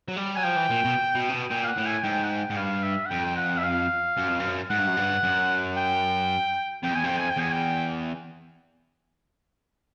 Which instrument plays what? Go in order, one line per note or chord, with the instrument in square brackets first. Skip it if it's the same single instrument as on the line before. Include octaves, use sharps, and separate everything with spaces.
[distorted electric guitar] F#3
G3
[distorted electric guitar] F#3 [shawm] G#5
[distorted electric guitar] F3 [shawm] G5
[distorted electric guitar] E3
A#2
B2
B2
C3
B2
[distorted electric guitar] A#2 [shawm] G5
[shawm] F5
F#5
[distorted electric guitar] A2
[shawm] G#5
[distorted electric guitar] G#2 [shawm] G5
[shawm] F#5
G5
[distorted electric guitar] G#2
[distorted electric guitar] G2 [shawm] F5
[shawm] E5
F#5
[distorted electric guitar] F2 [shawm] G5
[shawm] G5
F#5
E5
F5
[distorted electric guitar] F#2
F2
F#2
[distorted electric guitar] G#2 [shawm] F#5
[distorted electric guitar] G2
F#2
G2
F#2
[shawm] G5
[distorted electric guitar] F2 [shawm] G5
[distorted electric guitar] E2 [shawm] G#5
[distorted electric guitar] F2 [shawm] G5
[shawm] G#5
G5
[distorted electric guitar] E2 [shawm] G#5
[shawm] G5